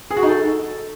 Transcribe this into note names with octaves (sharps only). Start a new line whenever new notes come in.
G#4
F#4
D#4
A4